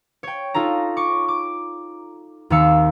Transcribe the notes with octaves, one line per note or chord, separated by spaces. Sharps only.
C#5 G5
D#4 F4 A4 A#5
C#6 D6
D6
D#2 D#3 C4 F5 E6 C#7